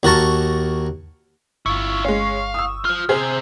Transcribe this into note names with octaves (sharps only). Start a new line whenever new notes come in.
D#2 F#4 A#4 A5 C#6
G1 E4 F4 C#6
G#3 C#4 F5
D#6 E6
F4 C5 F6
C3 C4 G#4 C5